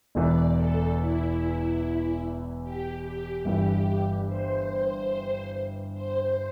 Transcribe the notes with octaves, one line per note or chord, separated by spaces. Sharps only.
E1 E2 E3 D5
A4
E4
G4
G4
G1 G2 E3 G4
C5
C5